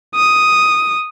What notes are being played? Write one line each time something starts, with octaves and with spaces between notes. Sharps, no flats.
D#6